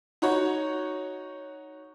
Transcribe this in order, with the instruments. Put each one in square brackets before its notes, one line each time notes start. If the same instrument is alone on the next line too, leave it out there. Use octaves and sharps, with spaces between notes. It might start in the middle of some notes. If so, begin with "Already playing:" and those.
[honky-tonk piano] D#4 F#4 C#5